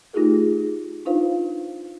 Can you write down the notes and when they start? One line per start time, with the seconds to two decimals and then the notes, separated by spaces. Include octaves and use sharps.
0.13 A3 D#4 F4 G4 G#4 A#4
1.05 D4 D#4 F4 B4 C5 F5